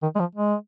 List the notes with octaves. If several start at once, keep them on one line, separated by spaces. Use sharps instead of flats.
D#3
G#3
F3
G#3